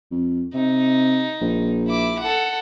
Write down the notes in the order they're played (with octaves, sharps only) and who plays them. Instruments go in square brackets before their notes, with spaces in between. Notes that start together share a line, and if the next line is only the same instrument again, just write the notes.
[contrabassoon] F2
[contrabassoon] C3 [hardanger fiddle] D#4
[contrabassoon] A#1
[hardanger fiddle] E4 D6
A4 F#5